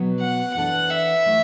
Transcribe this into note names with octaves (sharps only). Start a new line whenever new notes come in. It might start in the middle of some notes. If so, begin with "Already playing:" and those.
Already playing: B2 F#3 B3
F#5
E3 D4 A4 F#5
E5
E3 A3